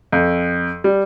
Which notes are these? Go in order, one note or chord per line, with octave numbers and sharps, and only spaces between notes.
F2
G3